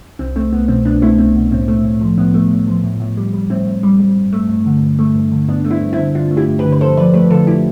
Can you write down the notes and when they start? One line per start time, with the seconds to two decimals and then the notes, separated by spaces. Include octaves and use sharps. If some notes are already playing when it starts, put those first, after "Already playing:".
0.19 C2 C4
0.36 A3 C4
0.52 C2 B3
0.68 B2 C4
0.85 C2 B3 D4
1.02 A3 C4 E4
1.18 C2 C4
1.35 B2
1.51 A2 C4
1.68 A3
1.85 A2
2.01 F3
2.18 A2 B3
2.34 A3
2.51 A2
2.68 F3
2.84 A2
3.00 A2
3.17 G3
3.33 G3
3.50 A2 C4
3.67 A2
3.83 G3
4.00 G3
4.16 G2
4.33 A3
4.49 G2
4.66 D3
4.82 G2
4.99 A3
5.15 G2
5.32 D3
5.48 G2 B3 D4
5.65 A3
5.71 C4 E4
5.82 G2
5.93 C4 E4
5.98 D3
6.15 G2 D4 F4
6.31 A3
6.37 E4 G4
6.48 G2
6.59 G4 B4
6.64 D3
6.72 B4
6.81 F2 A4 C5
6.97 F3 B4 D5
7.14 A3 G4 B4
7.30 D3 F4 A4
7.47 E4 G4